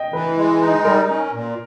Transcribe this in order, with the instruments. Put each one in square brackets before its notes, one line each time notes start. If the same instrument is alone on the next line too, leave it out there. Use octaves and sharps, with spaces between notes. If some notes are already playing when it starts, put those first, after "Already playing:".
Already playing: [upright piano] D#5 G5
[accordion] E3 [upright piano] B4
[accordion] G#3
D#4
[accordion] G3 [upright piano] A#4
[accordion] C#4
A#2